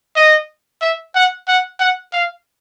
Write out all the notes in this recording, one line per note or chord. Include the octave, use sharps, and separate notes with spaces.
D#5
E5
F#5
F#5
F#5
F5